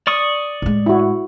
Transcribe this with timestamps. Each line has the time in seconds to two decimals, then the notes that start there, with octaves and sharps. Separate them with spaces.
0.07 D5 C#6 D#6
0.62 A2 G#3
0.86 E4 F#4